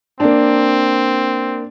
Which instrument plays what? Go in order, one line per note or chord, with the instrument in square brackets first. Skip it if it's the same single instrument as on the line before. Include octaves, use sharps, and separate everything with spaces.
[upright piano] A#3 D4 [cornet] C4